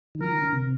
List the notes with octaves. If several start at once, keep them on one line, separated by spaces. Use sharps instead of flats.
D#3
F3 A#4
D#3
D3
C3